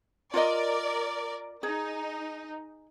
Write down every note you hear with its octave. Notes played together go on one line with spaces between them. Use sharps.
F4 A#4 D5 D#5
D#4 G#4